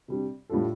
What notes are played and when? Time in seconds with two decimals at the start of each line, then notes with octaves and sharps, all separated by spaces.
0.08 C3 G3 D4
0.50 A2 G3 D4 F4 A4